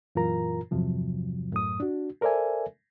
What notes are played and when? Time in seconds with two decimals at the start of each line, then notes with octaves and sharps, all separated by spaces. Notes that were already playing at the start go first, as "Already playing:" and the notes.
0.15 F#2 A#2 E3 F4 A#4 A#5
0.71 E2 G2 C3 F3 F#3
1.52 F#2 A2 D#6
1.80 D4 F#4
2.21 A4 A#4 C5 D5 E5 G#5